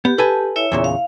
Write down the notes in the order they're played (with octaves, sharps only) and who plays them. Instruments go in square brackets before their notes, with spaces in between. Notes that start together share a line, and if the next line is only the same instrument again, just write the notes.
[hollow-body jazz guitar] B3 [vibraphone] G4
[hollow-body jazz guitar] A4 B4 G#5
[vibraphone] E4 C#5 E5
[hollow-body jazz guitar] E2 A#2 C#3
[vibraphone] F5